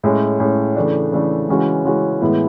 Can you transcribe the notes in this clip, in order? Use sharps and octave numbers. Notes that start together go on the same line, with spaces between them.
A2 G#3 C#4
A2 G#3 C#4
C#3 E3 A3 D4
C#3 E3 A3 D4
C#3 E3 G#3 C#4 F#4
C#3 E3 G#3 C#4 F#4
A2 E3 G#3 B3 E4